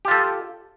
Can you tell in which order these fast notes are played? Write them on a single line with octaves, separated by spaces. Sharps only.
G4 F4 A4